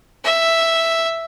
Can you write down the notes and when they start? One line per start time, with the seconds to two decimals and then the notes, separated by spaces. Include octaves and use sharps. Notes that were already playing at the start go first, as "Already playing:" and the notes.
0.24 E5